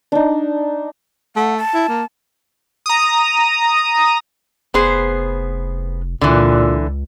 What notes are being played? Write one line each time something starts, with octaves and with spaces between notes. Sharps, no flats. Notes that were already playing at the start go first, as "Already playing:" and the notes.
D4 D#4
A3 F#5
A5
E4
A#3
A#5 D#6
F1 B3 G#4 C5
C#2 A#2 D3 E3